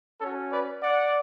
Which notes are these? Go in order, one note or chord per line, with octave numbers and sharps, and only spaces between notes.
C#4 F#4 A4 C#5
B4 D5
D5 F#5